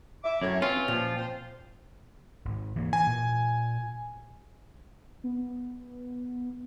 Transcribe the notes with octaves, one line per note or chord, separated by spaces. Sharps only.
E5 D6
F#2 A2 C#5
E3 C4 C#4 F4
A#2 F3
C4 C5
G#1
E3 A#3
E3 G#5
A#2
B3